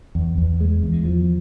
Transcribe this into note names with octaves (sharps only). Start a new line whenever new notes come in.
E2
E2
G#3
E2
F3